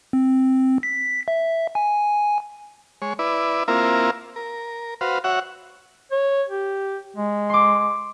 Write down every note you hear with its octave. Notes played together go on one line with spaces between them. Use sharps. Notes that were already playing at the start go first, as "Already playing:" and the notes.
C4
B6
E5
G#5
G#3 C#5
E4 B4 D5
A#3 C4 E4 F4 A#4
A#4
F#4 B4 C5 F5
F#4 C#5 E5 F#5
C#5
G4
G#3
C6 D6